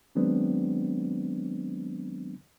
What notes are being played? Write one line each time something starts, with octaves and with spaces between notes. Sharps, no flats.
D#3 F#3 G#3 B3 C4 D4